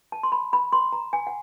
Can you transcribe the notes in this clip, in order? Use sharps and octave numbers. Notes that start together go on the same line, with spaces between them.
A5
C6
B5
B5
C6
A#5
G#5
F#5